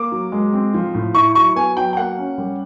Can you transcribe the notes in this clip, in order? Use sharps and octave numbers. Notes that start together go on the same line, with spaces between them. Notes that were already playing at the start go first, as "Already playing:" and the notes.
Already playing: A#3 D6
F#3
G#3
C4
F3
A2
E4 C#6
F#3 C#6
B3 G#5
F#3 G5
G5
A#3 F#5
C#4
G3